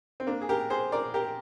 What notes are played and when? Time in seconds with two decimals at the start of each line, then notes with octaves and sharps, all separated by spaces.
0.20 C4
0.27 A#3 D4
0.41 G#4
0.49 G4 A#4
0.70 G#4 C5
0.92 A#4 D5
1.14 G4 A#4